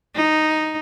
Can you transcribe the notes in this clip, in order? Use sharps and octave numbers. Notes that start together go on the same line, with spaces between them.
D#4